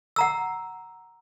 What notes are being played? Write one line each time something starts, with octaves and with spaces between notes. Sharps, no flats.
F#5 A#5 E6